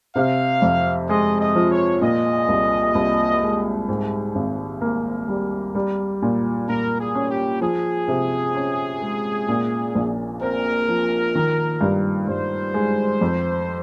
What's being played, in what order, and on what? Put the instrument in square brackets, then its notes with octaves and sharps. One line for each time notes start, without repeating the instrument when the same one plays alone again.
[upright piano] C3 [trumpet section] F5
[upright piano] F2
[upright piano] G#3 [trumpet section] D#5
[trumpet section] D#5
[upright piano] F3
[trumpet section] C#5
[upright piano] A#2 [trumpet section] D#5
[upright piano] C2
C2
G#3
G#2
G#1
A#3
G3
G3
A#2
[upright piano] A#2 [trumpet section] A#4
[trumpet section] G#4
[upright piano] C#4
[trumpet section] G4
[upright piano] F3 [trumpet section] G#4
[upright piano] C3
C#4
G#3
A#2
A#1
[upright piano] C4 [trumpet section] A#4
[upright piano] F3
D#3
G2
[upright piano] G2 [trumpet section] C5
[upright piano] G#3
F2